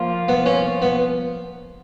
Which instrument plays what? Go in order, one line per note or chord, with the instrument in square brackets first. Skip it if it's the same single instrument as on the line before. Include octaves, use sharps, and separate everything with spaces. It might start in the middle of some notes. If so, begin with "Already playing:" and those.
Already playing: [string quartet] F3 A#3 F4
[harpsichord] B3
C#4
B3